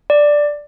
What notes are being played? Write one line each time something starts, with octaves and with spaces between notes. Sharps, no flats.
D5